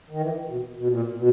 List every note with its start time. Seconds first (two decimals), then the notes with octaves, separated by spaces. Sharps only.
0.10 D#3
0.21 E3
0.48 B2
0.75 B2
0.89 A#2
1.01 B2
1.17 B2